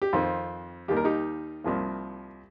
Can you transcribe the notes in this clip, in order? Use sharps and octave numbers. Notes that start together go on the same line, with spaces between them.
G4
F2 D#3 C4 F4
D#2 D#3 G3 A#3 G4
A#4
D#4 G4
C2 C3 F3 A#3